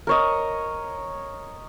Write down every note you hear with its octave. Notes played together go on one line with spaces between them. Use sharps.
A#4 C#5 D#5